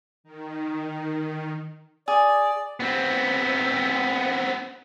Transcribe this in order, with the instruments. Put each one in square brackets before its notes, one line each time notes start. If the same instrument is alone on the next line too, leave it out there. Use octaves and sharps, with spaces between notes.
[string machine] D#3
[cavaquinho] G#4 [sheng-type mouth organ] D5
[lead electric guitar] B3 C4